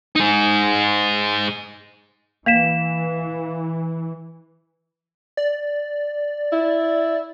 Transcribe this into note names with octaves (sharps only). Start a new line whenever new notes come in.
D#4 G#4
E3 A#3 F5 B6 E7
D5
E4